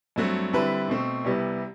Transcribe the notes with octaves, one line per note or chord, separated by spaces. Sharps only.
G2 F#3 A3 C4 F#4
D3 G3 C4 E4 B4
B2 A3 C4
C2 C3 G3 B3 E4